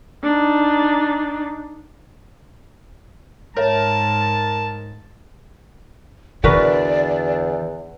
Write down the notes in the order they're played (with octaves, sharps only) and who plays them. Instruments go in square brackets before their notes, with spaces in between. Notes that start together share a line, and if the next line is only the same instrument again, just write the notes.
[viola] D4 D#4
[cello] G#2 [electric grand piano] A#4 [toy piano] C#5 E5 [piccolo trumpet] A5
[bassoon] E2 [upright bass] D3 [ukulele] F#4 A#4 B4 [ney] D5